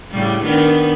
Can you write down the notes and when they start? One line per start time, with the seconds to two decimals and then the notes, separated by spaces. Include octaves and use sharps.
0.12 A2 C#3 G3
0.42 D#3 B3 D4